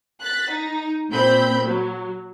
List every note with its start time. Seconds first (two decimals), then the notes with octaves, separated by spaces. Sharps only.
0.22 F#6 A6 B6
0.51 D#4
1.11 A#2 C4 B5 G6
1.65 F#3